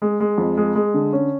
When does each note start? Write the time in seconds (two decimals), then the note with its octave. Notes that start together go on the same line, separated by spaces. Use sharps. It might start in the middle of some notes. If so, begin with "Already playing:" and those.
0.02 G#3
0.20 G#3
0.38 F2
0.57 G#3
0.75 G#3
0.94 D3
1.13 C#4